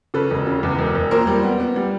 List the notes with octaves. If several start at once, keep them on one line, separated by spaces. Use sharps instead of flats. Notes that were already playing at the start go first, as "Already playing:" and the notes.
C#3 A4 B4
E1
C#3
E2
E1
E1
A#2 A#4 C5
G3
B3
B3
G3